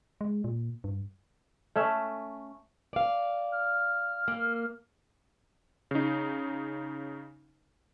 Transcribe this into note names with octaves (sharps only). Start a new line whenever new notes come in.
G#3
A#2
G2
A3 C#4 E5
D5 F5
F6
A#3
C#3 D#4